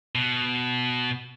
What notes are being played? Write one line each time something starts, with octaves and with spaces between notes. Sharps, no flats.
B2